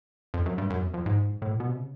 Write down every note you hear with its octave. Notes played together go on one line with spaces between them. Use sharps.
F2
F#2
G2
F#2
E2
F2
G#2
A2
A#2
B2
C3
C#3